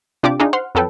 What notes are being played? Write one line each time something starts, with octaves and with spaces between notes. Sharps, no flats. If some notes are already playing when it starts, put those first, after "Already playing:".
C3 D4 F4 G4 D5 D6
D4 D#4 F4 G#4
C5 F#5 C6 F6
F2 F#3 A4 B4 G5